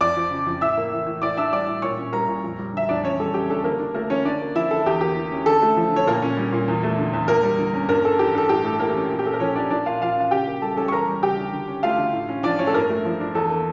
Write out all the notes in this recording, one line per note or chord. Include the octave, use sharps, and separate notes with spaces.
F2 D5 D6
F3
C#3
F2
A2 E5 E6
A#3
E3
A2
A2 D5 D6
D4 E5 E6
G3 D5 D6
A2
A#2 C#5 C#6
C#4
G3 A#4 A#5
A#2
F2
G3
D3 E5
F2 D4 D5
E2 C#4 C#5
G3 A4
C#3 G4
D4 A4
D3 A#3 A#4
D4
A3 A#3 A#4
D3 C#4 C#5
D3 D4 D5
A#3
F3 E4 E5
D3 A4
E2 G4
A#3 G4
E3
C#4
D3 A4
A3
F3
D3 C#5
A#2 A#3 A#4
C#4
G3
A#2
E2
A3
D3
E2
E2 A#3 A#4
G3
D3
C#4
G2 A#3 A#4
A#3 A4
E3 G4
G2 A4
A2 G4
A3 A4
E3 A#3 A#4
C#4
A#2
G4
A#3 A4
A#4
F3 C#4 C#5
D4 D5
A#2 D4 D5
A#3 F4 F5
F3 F4 F5
C#4 F5
C#3 G4 G5
A#3
G3 A4 A5
C#4 A4 A5
C#6
E2 A#4 A#5
G3
C#3 G4 G5
D4
D3
C#4
A3 F4 F5
D3
A2
C#4
F3 D4 D5
A2 C#4 C#5
A4
G2 A#3 A#4
A3
F3
D4
E2 A4
A#3